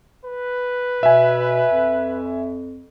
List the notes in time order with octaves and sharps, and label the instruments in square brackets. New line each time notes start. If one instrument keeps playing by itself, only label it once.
[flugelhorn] B4
[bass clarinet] B2 [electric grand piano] E5 G#5
[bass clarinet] F2